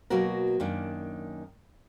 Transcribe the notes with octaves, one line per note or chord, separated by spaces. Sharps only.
B2 F#3 A#3 F#4 A#4
F#2 D#3 A#3 D4